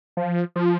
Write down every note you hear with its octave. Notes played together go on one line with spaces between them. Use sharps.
F3
F3